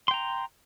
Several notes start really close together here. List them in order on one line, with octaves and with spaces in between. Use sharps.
C6 G5 A#5